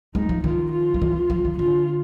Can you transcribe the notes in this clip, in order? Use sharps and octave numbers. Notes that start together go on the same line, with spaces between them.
G#3 D#4
F3
D#3 F4
F4
F3
E3
F3
D#3
D3 F4